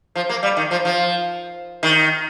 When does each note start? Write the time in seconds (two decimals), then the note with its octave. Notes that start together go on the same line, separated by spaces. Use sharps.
0.15 F3
0.29 A#3
0.43 G3
0.57 D#3
0.71 F3
0.85 F3
1.83 D#3